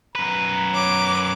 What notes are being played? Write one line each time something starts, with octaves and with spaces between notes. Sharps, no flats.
F#2 B4 A#5
C#5 D6